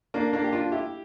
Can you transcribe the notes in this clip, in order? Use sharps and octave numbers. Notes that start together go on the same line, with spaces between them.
A#3 D4
A#3 D4
G4
D4 F4
E4 G4